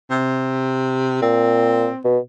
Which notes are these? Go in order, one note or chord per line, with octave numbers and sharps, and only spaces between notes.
C3
A#2 C4
B2